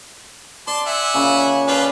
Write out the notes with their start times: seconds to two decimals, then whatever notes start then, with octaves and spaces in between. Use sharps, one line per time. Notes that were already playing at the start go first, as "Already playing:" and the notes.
0.67 D5 A5 C6
0.87 E5 F#5 G#5
1.14 A#2 C#3
1.68 D4 F4 G4 B4